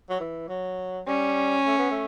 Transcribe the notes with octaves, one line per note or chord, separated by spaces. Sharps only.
F#3
E3
F#3
G3 C#4
A3
B3
A3